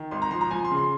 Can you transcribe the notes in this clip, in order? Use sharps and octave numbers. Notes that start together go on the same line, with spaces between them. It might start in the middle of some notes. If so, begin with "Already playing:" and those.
Already playing: D#3
G#1 C6
A#5
F3 C6
A#5
F3 G#5
C6
C#3
C6